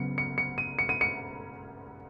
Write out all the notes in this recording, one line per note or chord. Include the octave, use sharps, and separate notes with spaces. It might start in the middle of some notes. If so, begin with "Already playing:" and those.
Already playing: C#3 F#3 B3 C#7
C#7
C#7
D#7
C#7
D#7
C#7